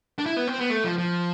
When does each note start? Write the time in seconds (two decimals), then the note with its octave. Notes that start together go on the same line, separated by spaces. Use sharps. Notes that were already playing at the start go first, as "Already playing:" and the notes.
0.18 D4
0.26 E4
0.37 B3
0.47 C4
0.59 B3
0.70 A3
0.84 F3
0.98 F3